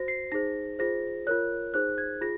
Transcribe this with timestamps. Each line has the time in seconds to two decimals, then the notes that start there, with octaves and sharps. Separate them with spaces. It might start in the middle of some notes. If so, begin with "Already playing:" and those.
Already playing: F#4 C5 A#6
0.08 C7
0.32 D#4 G#4 C5 A#6
0.79 F4 G#4 C5 A#6
1.27 F4 A#4 C#5 F#6
1.74 D#4 G#4 C5 F#6
1.98 G#6
2.21 F4 G#4 A#6